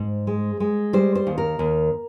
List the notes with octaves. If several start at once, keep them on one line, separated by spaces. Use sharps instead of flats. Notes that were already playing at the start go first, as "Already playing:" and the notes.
Already playing: G#2 C5
G#3
G#3
G3 C5
C5
D#2
A#4
D#2